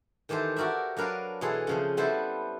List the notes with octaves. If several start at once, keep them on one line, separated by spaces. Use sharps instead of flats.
D#3 E3 G4 A4 C5
F#4 G4 A#4 D5 E5
F#3 D4 A#4 B4 D5 F5
B2 E3 G#4 A4 C6
C#3 F3 C4
G3 B3 E4 A4 C5